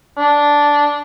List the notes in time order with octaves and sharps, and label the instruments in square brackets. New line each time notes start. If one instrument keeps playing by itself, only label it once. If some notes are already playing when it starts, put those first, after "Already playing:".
[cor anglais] D4